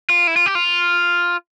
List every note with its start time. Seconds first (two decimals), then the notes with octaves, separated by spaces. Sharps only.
0.10 F4
0.27 E4
0.36 F4
0.46 G4
0.55 F4